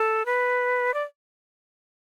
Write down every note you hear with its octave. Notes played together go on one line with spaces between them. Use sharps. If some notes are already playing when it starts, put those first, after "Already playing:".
Already playing: A4
B4
D5